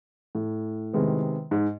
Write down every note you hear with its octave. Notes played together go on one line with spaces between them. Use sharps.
A2
C3 D#3 G#3 B3
G#2